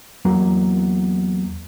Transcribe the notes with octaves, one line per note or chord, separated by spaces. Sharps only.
E2 F#3 A#3